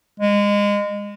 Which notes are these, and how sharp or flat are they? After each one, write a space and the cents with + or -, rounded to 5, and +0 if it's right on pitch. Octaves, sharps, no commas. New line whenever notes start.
G#3 -25